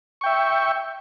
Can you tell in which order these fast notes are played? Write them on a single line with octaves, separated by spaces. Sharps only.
C#6 G5 E5